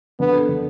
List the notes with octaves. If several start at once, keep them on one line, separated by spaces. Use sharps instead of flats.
D3 B3
A4
D3